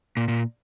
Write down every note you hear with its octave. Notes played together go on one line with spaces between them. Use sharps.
A#2
A#2